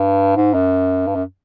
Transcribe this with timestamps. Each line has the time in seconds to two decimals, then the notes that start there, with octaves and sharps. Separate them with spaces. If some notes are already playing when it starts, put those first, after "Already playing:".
Already playing: G2
0.36 G#2
0.54 F#2
1.07 G2
1.15 F#2